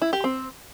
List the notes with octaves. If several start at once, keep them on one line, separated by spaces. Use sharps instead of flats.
E4
G4
C4